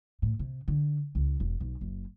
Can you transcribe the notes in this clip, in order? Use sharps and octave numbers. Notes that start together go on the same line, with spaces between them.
A2
C3
D3
C#2
E1
B1
F#1